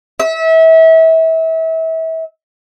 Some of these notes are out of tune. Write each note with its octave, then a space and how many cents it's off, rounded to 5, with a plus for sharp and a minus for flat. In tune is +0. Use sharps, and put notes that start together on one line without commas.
E5 -30